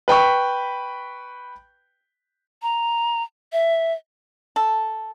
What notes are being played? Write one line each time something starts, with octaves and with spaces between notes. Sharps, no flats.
B4 G5 B5 C#6
A#5
E5
A4